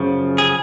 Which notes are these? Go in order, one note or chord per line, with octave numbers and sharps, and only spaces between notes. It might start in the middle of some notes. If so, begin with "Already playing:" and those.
Already playing: F#2 C#3 F3
G#4